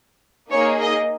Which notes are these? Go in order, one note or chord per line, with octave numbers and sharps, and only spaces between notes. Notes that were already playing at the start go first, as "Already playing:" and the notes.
A#3 D#4 G#4 C#5
D#5